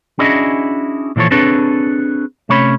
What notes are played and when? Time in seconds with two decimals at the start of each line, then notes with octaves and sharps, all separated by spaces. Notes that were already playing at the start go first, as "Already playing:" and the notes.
0.19 C#4 D4 E4 F#4 G#4 D#5
1.16 A#2 E3 F3 A4 C#5
1.31 C4 D4 G#4 A4 B4 C#5
2.49 C3 A3 C#4 C#5 B5